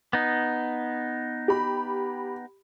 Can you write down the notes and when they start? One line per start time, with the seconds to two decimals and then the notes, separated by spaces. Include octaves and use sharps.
0.13 B3 D#4
1.48 G4 B5